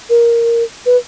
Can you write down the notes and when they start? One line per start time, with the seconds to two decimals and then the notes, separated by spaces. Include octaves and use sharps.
0.10 A#4
0.86 B4